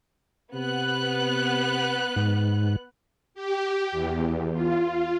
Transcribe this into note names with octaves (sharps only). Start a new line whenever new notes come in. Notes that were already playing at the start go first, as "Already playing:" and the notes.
C3 B3 F#6
G#2
G4
E2
F4